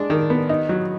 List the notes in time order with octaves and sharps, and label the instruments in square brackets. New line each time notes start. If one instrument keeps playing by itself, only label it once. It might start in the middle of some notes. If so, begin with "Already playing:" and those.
Already playing: [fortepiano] G#3 D4
D#3
B3
D#4
F#3